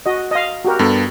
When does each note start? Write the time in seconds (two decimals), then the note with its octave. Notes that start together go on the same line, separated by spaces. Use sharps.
0.06 F#4 D#5
0.31 D#5 F5
0.64 F#4 G4 A#4
0.79 G2 B3 A4